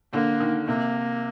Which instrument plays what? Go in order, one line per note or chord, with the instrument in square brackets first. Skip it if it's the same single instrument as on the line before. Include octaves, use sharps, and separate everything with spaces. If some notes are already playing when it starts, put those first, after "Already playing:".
[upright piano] D3 [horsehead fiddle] A#3
[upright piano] D#3
[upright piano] C3 [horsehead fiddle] A#3